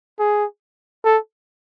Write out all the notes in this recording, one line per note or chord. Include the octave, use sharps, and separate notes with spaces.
G#4
A4